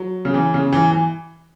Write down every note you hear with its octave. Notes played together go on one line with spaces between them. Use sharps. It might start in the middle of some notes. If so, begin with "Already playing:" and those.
Already playing: F#3
C#3
E3
C#3
E3
E3